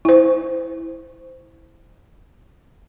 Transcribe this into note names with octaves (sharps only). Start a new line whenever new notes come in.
E4 C5